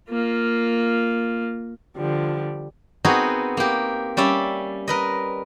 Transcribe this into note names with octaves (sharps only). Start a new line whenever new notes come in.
A#3 F4
D3 F3 G3
B3 C4 D#4 F#4 G#4 A#4
A#3 G4
G3 C#4 D5 E5
A#4 B4 D#5